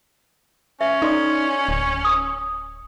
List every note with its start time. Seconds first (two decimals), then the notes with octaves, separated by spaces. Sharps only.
0.81 C#4 E5
1.02 D#4 A4 D5 C6
1.69 D1
2.05 D#6